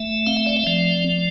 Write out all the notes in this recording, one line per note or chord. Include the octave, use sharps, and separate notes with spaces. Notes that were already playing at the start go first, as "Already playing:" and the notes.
Already playing: A3 E5
C4 F5
E5
D5
E5
F3 D5